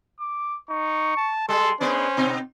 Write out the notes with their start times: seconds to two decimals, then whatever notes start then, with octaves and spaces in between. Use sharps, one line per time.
0.20 D6
0.69 D#4 C#6
1.17 A5
1.49 G3 G#3 A4 C6
1.81 G#3 B3 C#4 D4 C5
2.17 B2 C4 D#4